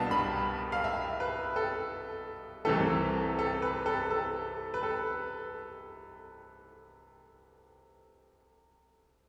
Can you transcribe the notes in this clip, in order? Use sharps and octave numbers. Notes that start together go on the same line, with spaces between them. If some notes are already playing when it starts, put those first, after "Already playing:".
Already playing: C2 B2 B3 D4 F5 A5
B5
F5
E5
B4
A4
C2 C3 E3 A3 A4
A4
B4
A4
A4
B4
A4